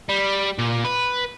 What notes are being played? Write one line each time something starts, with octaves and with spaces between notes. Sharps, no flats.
G3
A#2
B4